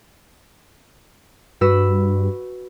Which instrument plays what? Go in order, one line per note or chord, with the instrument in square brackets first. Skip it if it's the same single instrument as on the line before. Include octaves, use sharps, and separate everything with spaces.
[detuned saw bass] G2 [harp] F#4 B4 E6